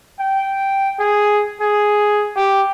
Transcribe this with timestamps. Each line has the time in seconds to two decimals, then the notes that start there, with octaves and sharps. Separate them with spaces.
0.20 G5
0.99 G#4
1.61 G#4
2.36 G4